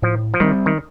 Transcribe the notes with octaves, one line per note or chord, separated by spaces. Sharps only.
A2 F3
F3
D#3 G3 C4
D#3